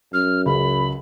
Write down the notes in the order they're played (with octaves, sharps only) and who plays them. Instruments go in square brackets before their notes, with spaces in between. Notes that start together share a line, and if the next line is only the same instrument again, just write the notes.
[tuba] F#2 [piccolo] F6
[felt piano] C#2 [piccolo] B5